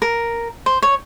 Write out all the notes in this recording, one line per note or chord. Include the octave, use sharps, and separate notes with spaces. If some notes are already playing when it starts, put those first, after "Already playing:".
A#4
C5
C#5